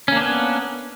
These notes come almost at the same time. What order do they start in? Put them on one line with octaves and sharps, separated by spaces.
C#4 A#3 D4 B3